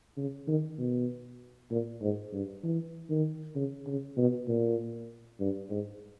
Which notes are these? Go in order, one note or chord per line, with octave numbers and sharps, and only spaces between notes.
C#3
D#3
B2
A#2
G#2
G2
E3
D#3
C#3
C#3
B2
A#2
G2
G#2